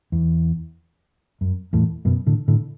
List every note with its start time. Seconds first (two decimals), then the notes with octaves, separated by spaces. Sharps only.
0.12 E2
1.41 F#2
1.73 E2 A2
2.05 F#2 B2
2.26 A2 D3
2.48 A2 D3